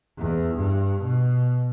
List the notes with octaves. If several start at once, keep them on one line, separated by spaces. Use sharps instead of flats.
E2
G2
B2